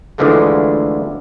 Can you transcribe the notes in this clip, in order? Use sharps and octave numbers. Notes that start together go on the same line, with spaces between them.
D2 D3 E3 F3 G#3 A3